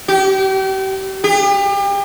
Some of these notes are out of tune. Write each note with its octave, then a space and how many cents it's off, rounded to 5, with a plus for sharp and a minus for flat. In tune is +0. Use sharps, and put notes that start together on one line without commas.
G4 -35
G4 +35